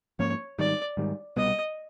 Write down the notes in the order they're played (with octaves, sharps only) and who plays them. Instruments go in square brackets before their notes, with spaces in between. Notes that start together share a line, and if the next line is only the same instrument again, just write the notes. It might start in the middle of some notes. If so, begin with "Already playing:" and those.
[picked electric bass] G#2 F3 A#3 C#4 [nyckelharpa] C#5
[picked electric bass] G#2 D#3 G3 [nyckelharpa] D5
[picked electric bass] G#2 D#3 G3
[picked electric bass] C2 B2 G3 B3 [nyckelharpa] D#5